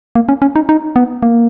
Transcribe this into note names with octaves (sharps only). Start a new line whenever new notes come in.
A#3
C#4
C#4
D#4
D#4
B3
A#3